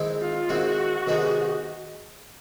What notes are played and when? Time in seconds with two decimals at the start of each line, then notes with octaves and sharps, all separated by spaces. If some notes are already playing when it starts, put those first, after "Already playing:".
Already playing: D#3 G#3 C4 E4
0.21 F4
0.49 D#3 G#3 C4 E4 F#4
1.07 C3 D#3 G#3 B3 D#4